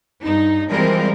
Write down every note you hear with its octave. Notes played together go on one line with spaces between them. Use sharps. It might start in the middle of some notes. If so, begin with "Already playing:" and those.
G2 D#4
E3 F3 G3 G#3 C4 A#4